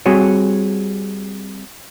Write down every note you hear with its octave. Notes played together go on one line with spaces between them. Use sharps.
G3 C4 F#4 G#4 C#5